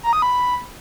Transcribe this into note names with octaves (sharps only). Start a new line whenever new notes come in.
A#5
D#6
B5